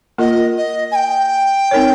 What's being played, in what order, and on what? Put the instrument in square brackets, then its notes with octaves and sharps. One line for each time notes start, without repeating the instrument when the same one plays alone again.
[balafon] A#3 F4 A#4 [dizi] D#5
[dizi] D#5
G#5
G5
[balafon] C4 D#4 A#4 C#5